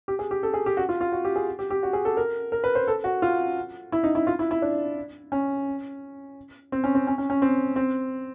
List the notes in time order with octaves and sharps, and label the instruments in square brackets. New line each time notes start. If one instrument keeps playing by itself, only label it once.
[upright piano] G4
G#4
G4
A4
G#4
G4
F#4
F4
F4
F#4
G4
G#4
G4
G4
F#4
G#4
A4
A#4
A#4
B4
C5
A4
F#4
F4
E4
D#4
E4
F4
E4
E4
D4
C#4
C4
C#4
C4
C#4
C#4
C#4
C4
C4